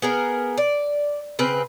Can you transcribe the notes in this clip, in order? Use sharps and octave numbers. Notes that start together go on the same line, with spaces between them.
B3 G#4 A#4
D5
C#3 C4 B4